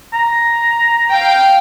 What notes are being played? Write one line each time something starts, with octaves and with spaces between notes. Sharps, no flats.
A#5
F5 G5